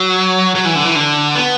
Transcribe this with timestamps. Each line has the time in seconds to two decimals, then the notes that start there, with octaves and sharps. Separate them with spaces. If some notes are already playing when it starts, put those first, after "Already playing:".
Already playing: F#3
0.55 F#3
0.65 E3
0.75 D3
0.85 E3
0.95 D3
1.35 B3